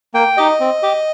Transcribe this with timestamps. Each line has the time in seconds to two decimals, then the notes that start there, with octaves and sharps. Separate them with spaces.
0.14 A#3 G5
0.37 D#4 G4 D#5
0.60 C4
0.83 G4